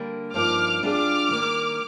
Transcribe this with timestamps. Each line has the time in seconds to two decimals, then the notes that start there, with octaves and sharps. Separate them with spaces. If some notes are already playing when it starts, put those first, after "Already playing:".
Already playing: D3 G3 A#3
0.34 G2 F3 A#3 D#4 D6 F6
0.82 G3 D4 F4 G#4 D5 D6 F6
1.31 D#3 G3 A#3